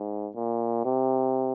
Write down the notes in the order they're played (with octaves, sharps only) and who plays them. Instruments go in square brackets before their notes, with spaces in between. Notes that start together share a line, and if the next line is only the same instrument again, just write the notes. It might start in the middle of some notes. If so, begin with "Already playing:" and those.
Already playing: [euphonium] G#2
A#2
C3